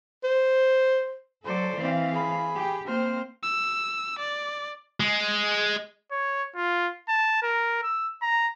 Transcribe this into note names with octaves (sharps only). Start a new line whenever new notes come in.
C5
F#3 A4 C5 D5
E3 C4 F5
G#4 B5
G4
A#3 C4 C5 F6
E6
D5
G#3
C#5
F4
A5
A#4
E6
A#5